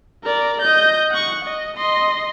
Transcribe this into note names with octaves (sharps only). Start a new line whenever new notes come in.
A#4 D5
D#5 G6
F#5 C#6
D#5
D#5 C6